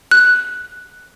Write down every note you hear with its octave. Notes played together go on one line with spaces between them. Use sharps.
F#6